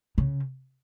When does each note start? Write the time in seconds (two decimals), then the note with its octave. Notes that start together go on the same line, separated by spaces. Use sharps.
0.18 C#3